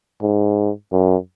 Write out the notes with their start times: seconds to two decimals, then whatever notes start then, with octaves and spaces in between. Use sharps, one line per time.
0.22 G#2
0.92 F#2